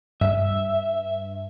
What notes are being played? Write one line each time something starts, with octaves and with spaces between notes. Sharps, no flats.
G2 E5